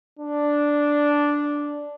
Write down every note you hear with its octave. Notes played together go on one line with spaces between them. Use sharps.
D4